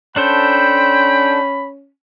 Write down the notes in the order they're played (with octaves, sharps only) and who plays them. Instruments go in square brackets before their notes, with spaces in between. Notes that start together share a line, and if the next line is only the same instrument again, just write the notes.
[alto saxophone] C#4 [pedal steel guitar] D4 A4 C5 [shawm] G5 [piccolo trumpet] B5